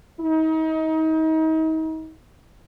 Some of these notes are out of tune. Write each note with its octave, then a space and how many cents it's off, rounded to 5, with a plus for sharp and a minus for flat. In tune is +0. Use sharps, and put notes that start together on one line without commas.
D#4 +35